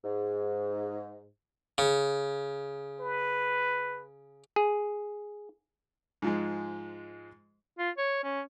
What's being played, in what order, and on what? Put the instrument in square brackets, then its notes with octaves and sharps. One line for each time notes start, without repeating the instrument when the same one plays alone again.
[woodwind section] G#2
[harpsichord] C#3
[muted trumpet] B4
[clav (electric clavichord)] G#4
[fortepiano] G#2 F3 G#3
[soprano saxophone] F4
C#5
C#4